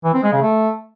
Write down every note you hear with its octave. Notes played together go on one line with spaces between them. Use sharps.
E3
C4
G#3
C#3
A3